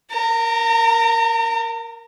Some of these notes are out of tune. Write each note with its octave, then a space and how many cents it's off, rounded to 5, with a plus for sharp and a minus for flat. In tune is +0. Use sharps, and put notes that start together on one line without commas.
A#4 +0 A#5 -40